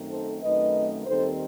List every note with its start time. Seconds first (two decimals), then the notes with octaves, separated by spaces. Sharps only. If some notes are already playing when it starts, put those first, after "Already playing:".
Already playing: F#2 D#3 A3 C4 D#4
0.11 A4 C5
0.42 F#2 D#3 A3 C4 D#4 B4 D#5
1.06 D#2 D#3 G3 C4 A4 C5